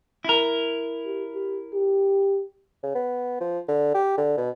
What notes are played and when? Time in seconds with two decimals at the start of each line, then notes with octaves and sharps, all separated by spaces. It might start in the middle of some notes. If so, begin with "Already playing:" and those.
0.25 E4 A#4
1.05 G4
1.35 G4
1.73 G4
2.83 C#3
2.95 B3
3.40 F3
3.68 D3
3.94 G4
4.17 D3
4.38 B2